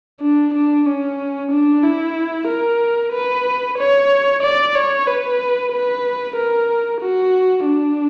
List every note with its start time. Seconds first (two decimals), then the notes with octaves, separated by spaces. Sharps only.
0.21 D4
0.54 D4
0.86 C#4
1.51 D4
1.84 E4
2.48 A#4
3.13 B4
3.78 C#5
4.43 D5
4.75 C#5
5.07 B4
5.72 B4
6.36 A#4
7.01 F#4
7.66 D4